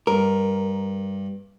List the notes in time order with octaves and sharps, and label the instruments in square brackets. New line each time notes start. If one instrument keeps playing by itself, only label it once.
[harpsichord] G2 [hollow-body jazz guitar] A#4